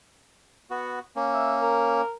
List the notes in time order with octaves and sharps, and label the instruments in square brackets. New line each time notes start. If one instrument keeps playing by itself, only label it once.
[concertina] B3 F#4
A#3 C#4
[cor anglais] E5
A#4